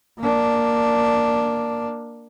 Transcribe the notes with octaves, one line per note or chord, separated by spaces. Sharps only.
A#3 D4